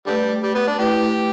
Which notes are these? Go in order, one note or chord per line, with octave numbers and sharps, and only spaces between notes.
D3 G3 A3 G4 B4 D5
G3
B3
D4
A3 E4 G4 B4